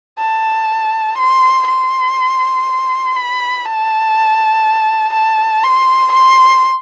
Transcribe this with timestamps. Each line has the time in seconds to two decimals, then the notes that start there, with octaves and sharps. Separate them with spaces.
0.19 A5
1.18 C6
1.67 C6
3.15 B5
3.65 A5
5.14 A5
5.63 C6
6.13 C6